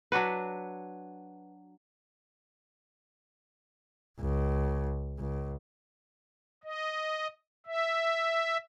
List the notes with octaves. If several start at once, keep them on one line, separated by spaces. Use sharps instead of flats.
F#3 D4 F#4 B4
C#2
C#2
D#5
E5